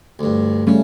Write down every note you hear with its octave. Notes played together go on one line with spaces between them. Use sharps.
D2 G2
C#3 G3 A3 C#4